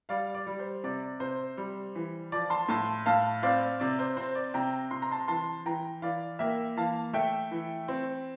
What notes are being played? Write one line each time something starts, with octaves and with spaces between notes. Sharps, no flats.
G3 D5 F5
D5
G3
C5
C3 D5
C3 C5
G3
E3
F3 D5
A5 C6
A2 A5 C6
A2 F5 A5
C4 D5 F5
C3 D5
C5
C4 C5
D5
C3 G5 A#5
C3 C6
A#5
A5 C6
E3 A5 C6
E3 G5 A#5
E3 D5 F5
A#3 E5 G5
E3 F5 A5
A3 E5 G5
E3
C4